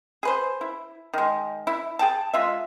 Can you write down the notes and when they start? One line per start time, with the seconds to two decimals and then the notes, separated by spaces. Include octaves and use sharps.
0.23 G#4 B4 C5
0.61 E4
1.13 D#3 G#3
1.67 E4
1.99 G#4 G5 A5
2.34 G#3 F4 E5